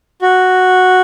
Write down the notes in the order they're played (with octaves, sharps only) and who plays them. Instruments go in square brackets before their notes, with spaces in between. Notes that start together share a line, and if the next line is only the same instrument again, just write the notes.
[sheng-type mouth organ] F#4